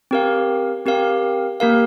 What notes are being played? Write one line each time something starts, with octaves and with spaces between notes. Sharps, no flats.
C4 G4 A#4 F5
C4 G4 A#4 F5
A#3 G4 A#4 F5